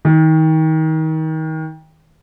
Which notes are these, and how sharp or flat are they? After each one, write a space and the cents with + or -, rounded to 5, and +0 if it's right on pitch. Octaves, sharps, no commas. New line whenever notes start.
D#3 +30